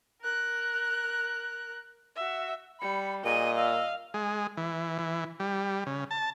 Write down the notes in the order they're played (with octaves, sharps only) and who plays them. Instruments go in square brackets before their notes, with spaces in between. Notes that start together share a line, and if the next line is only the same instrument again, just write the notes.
[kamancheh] A#4 F#6
F#4 E5
[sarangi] G3 [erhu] B5 [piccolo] C#7
[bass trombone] A#2 [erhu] G#4 [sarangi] D#5 [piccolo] D#7
[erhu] F5 [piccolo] E6
[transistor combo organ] G#3
E3
E3
G3
C#3
A5